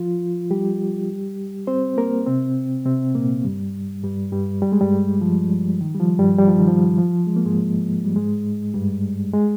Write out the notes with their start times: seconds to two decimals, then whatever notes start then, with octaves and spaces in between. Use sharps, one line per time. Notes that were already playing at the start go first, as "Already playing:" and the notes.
Already playing: F3 F4
0.51 G3 G4
1.67 C4 C5
1.97 A#3 A#4
2.26 C3 C4
2.86 C3 C4
3.15 A#2 A#3
3.44 G2 G3
4.04 G2 G3
4.32 G2 G3
4.62 G3
4.72 G#3
4.81 G2 G3
5.21 F3
5.81 D#3
5.95 G3
6.00 F3
6.19 G2 G3
6.38 G3
6.48 F3
6.58 D#3
6.67 F3
6.98 F3
7.27 G#3
7.36 A#3
7.45 G#2 G#3
8.05 G3
8.16 G#2 G#3
8.74 G2 G3
9.34 G#3